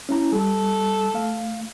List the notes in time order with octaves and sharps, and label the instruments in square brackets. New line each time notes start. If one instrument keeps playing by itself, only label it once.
[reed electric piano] C#4 E4 A#5
[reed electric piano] G3 [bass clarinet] A4
[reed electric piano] A3 F5